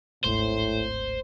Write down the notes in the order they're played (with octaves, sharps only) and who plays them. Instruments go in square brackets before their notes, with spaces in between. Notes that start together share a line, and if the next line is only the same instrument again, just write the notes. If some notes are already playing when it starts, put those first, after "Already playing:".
[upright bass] D1 G#1 [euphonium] A2 [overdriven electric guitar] C5